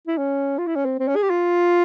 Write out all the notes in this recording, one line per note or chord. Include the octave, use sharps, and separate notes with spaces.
E4
C#4
F4
E4
C#4
C4
C4
C#4
G#4
G4
F4